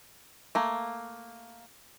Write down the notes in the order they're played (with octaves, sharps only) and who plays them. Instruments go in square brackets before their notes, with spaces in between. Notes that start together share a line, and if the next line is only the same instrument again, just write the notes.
[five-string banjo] A3 A#3